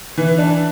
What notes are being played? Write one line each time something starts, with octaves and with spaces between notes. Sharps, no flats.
E3
D4